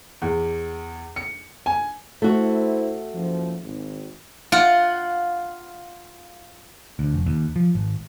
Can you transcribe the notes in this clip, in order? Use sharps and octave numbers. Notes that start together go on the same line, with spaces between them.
E2
C#7
G#5
A3 E4 F#4 C5
F#1 F#2 F3
G#1
F4 F#5
D2
F1
D#2
F3
G#1